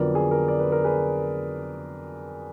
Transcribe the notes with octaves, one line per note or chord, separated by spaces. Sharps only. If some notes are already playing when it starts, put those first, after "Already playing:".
Already playing: F2 D3 F#3 B3 A#4 D5
G#4
A#4
D5
B4
A#4
G#4 B4